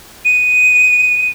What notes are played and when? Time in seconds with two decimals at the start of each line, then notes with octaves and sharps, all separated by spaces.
0.25 D#7